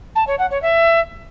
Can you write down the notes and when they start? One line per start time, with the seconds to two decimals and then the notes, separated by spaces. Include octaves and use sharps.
0.15 A5
0.27 C#5
0.39 F#5
0.50 C#5
0.62 E5